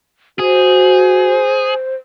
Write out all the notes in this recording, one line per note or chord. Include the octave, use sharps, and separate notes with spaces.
F#4 G#4 C5